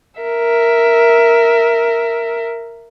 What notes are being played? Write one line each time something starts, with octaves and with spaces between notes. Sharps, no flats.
A#4 E5